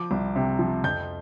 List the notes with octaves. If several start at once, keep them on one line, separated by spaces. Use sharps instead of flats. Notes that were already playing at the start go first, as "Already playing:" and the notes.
Already playing: F3 D6
C2
C3
F3
F2 G6